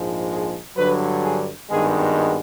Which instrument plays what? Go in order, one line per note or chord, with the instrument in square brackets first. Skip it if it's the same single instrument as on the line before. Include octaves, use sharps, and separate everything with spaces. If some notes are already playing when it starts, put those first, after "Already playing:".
Already playing: [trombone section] A#1 G#2 F3 G#3
G#4
G2 D3 F#3 B4
G#4
G#1 G2 D#3 G#3 B3 G#4